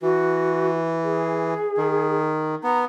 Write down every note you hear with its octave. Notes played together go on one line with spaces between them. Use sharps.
E3 F#4
G#4
D#3
B3 A#5